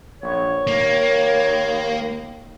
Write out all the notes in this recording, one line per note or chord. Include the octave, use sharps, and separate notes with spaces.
A#1 C#5
D#2 A#3